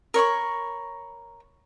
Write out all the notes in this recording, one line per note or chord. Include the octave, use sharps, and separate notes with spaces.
A#4 C#5 B5 C#6